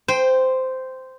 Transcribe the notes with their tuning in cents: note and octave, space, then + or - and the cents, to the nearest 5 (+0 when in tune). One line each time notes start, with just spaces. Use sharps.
C5 -10 G5 +10